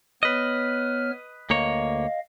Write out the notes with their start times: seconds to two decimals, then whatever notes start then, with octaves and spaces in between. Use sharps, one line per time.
0.23 B3 B4 C#5 D#5 F6
1.50 D2 A#3 C#5 D#5 F5